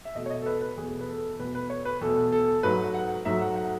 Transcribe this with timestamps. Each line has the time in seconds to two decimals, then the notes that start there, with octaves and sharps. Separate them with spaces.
0.05 E5
0.15 E2 B2 A3 D#5
0.26 C#5
0.30 D#5
0.42 A4
0.46 B4
0.61 B4
0.77 E2 B2 A3 G#4
1.00 B4
1.09 A4
1.39 E2 B2 A3 B4
1.55 B4
1.70 C#5
1.85 B4
2.01 E2 B2 A3 A4
2.32 A4
2.63 G#2 F#3 A3 B4
2.94 F#5
3.25 G#2 F#3 A3 E5
3.41 F#5
3.56 F#5